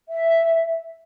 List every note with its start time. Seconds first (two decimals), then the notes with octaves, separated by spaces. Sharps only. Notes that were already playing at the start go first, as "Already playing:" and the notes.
0.10 E5